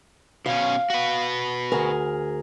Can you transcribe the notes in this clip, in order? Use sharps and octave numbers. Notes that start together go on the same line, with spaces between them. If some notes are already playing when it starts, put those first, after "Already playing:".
B2 C#4 F5
F#4 B4
D2 G#4 A#4